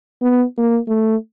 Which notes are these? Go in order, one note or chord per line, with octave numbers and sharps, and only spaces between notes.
B3
A#3
A3